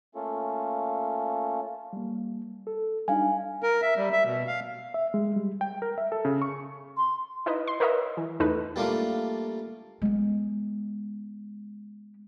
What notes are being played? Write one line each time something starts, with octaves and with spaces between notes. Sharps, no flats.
A3 A#3 C#4 F4 A4
G3 A#3
A4
G3 D4 D#4 F5 G#5
A#4
E5
G3
E5
B2
F5
E5
G#3
G3
G5
A#4
E5
A4
C#3
C#6
C6
D#4 E4 B4 D#5
C6
A#4 B4 C#5 D#5 E5 A#5
E3
E2 A3 D#4 B4
G3 A3 A#3 D4 F4
G#3 B3